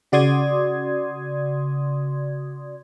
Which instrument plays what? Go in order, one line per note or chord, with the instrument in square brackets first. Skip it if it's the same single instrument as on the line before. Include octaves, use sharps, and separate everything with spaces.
[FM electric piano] C#3 F#4 D5 C6 D#6 G#6